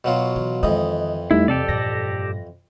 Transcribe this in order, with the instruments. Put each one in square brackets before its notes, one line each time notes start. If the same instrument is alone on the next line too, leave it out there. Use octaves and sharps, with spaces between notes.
[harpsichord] B2 F#3 F4
[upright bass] E3
[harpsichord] F2 E3 [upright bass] D#3 G#3 [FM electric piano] D#5
[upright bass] E2 [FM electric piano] G3 A3 D#4 [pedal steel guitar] E4
[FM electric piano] C3 [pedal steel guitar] G4 A4 D5
[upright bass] G2 A#2 [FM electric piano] A#6